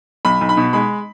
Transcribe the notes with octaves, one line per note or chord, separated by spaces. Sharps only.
B1 B5
B1
B5
B2
G#3 B5